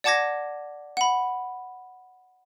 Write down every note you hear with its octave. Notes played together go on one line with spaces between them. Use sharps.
D5 F#5 A5 D6 G#6 A#6
F#5 B5